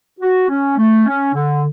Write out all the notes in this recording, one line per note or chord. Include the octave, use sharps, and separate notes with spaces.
F#4
C#4
A3
C#4
D3